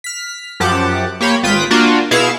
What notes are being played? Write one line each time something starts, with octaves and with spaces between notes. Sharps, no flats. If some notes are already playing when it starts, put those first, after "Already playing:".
F6 B6
F#2 F3 G4 F#5 A5 D6
A#3 G4 C#5 B5
G#1 F4 B4 G5 D#6 B6
A#3 D4 F4 F#4
B2 E4 G#4 F5 C#7 E7